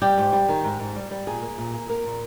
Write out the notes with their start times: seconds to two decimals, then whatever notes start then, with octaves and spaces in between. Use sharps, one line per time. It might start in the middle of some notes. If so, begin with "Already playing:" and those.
0.02 G3 G4
0.17 G#2
0.33 G3
0.48 D#3
0.64 G#2
0.80 G#2
0.96 G3
1.11 G3
1.27 A#2 G#4
1.42 A#3
1.58 A#2
1.74 A#3
1.89 A#3 A#4
2.05 A#2